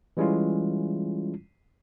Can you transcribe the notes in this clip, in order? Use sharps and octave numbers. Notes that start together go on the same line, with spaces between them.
E3 G3 G#3 C#4 E4 F4